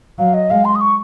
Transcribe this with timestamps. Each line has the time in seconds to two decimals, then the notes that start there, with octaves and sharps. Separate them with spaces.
0.18 F#3 F5
0.34 D#5
0.50 G#3 F5
0.65 C6
0.75 D#6
0.81 C#6